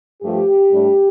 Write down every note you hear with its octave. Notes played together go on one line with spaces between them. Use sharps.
G2 F3 A3 G4
A2 G3 D4